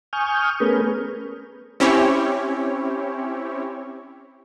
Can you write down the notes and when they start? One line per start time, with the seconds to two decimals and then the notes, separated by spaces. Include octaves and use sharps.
0.13 G#5 C#6 D#6 F6 G6
0.60 A3 B3 C#4 G#4 A#4 B4
1.80 C4 C#4 E4 G4 C#5